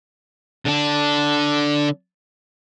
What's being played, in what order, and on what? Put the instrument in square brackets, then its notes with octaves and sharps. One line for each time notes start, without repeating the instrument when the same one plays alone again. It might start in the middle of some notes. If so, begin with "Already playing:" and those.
[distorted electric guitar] D3 D4